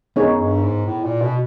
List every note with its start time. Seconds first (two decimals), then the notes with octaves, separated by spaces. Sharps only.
0.16 F#2 B3 D#4 G#4 C#5
0.40 G2
0.63 G#2
0.86 A2
1.04 A#2
1.22 B2